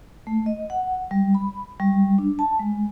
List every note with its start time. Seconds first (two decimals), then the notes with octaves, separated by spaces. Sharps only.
0.27 A3
0.46 D#5
0.70 F#5
1.11 G3
1.35 B5
1.80 G3
2.18 D4
2.39 A5
2.59 G#3